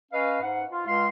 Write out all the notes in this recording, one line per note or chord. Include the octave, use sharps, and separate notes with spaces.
C#4 B4 D#5 F5
G#2 F#5
F4
C#2 F5 C6